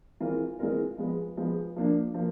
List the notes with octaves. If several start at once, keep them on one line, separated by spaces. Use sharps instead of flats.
E3 G#3 C4 F4 A#4
E3 G#3 C4 F4 A#4
F3 G#3 B3
F3 G#3 B3
F3 A#3 D4
F3 A#3